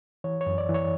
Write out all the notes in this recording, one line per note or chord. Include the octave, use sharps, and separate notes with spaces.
E3 C#5
C#5
F#2
D5
E3
C#5